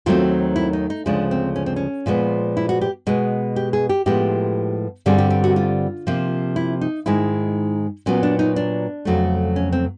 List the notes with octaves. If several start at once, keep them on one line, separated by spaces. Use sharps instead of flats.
D#2 D#3 F#3 A3 C4 F4
E4
D#4
D#4
D2 C#3 F3 G#3 D4
C4
C#4
C4
C#4
A#2 F3 G#3 B3
E4
F#4
G4
B2 G#3 B3
G4
G#4
G4
A2 F3 G#3 B3 G4
G2 D3 G3 C4 G#4
G4
G4
F#4
F4
C3 F3 A#3
E4
D#4
G#2 D#3 G#3 E4
A#2 F#3 B3 C#4
D4
D#4
D4
F2 C#3 F#3 A3
C#4
C4